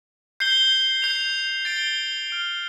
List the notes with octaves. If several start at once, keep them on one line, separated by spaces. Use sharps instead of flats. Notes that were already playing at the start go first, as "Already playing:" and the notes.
G6 C7 G7
G6 C7 F7
A6 D7 G7
F6 D7 G7